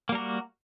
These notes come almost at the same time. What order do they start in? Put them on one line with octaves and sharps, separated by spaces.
A#3 G3 A#4 F#4